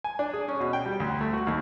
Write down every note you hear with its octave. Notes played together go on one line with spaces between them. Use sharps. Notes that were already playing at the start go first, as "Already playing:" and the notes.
G#5
D4
G#4
C#4
B2
G5
G3
D2
A3
F#4
D#2